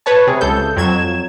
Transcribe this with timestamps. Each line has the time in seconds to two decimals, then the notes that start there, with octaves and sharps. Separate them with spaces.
0.06 B4 C#5 A5
0.27 C3 G#4
0.41 C#2 A4 G6
0.76 F2 F#3 G#6 E7